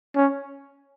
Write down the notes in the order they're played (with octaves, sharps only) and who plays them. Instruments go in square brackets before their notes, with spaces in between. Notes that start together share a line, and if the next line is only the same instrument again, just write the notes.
[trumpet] C#4